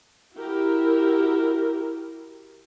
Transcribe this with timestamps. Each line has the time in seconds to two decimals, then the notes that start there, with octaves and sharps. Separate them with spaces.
0.34 E4 F#4 G4 A#4